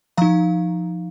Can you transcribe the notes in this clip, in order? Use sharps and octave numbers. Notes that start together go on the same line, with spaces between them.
F3 D#4 F5 A#5